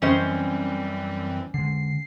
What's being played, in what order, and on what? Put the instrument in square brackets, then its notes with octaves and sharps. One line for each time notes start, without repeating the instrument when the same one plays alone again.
[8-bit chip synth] F#2 E3 C4 [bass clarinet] G3 [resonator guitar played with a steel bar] C#4 C5 D#5
[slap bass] D3 G#3 [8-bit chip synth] C7